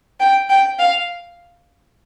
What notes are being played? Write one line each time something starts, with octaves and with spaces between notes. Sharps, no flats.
G5
G5
F5